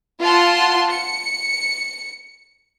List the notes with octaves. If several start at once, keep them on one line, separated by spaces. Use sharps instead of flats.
F4 F#5 A5 C6
C#7